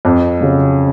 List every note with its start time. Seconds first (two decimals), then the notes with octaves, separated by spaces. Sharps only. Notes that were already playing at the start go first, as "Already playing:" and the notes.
0.05 F2
0.41 C#3 F#3